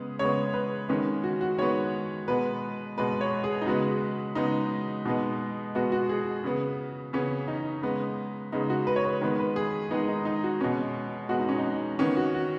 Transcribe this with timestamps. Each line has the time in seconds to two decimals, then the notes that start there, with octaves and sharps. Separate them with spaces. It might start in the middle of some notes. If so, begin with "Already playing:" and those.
Already playing: C#3 G#3 B3 G#4
0.19 C#3 G#3 B3 C#5
0.54 B4
0.89 D#3 G#3 B3 C#4
1.24 F#4
1.41 F#4
1.58 D#3 G#3 B3 C#5
2.28 B2 G#3 B3 B4
2.97 B2 G#3 B3 B4
3.21 C#5
3.44 G#4
3.62 D#4
3.66 C#3 G#3 B3 F#4
4.35 C#3 G#3 B3 D#4
5.05 B2 G#3 B3 D#4
5.75 B2 G#3 B3 F#4
5.92 F#4
6.09 G#4
6.44 C#3 B3
7.13 C#3 B3 C#4
7.48 D#4
7.82 C#3 G#3 B3
8.52 C#3 G#3 B3 D#4
8.70 F#4
8.87 B4
8.96 C#5
9.05 B4
9.21 D#3 G#3 B3 B4
9.39 B4
9.56 G#4
9.91 D#3 G#3 B3 D#4
10.08 D#4
10.25 D#4
10.44 F#4
10.60 B2 G#3 B3 C#4
11.29 B2 G#3 B3 F#4
11.39 D#4
11.49 C#4
11.58 D#4
11.99 D#3 B3 C#4
12.17 F#4
12.34 F#4